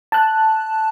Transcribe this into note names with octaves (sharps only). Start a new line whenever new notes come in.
A5 F#6